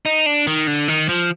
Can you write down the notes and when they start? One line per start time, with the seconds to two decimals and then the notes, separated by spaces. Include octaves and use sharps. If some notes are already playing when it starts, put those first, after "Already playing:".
0.06 D#4
0.26 D4
0.47 D#3
0.67 D3
0.88 D#3
1.09 F3